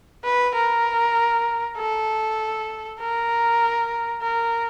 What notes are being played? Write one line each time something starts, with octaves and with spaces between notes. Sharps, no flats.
B4
A#4
A4
A#4
A#4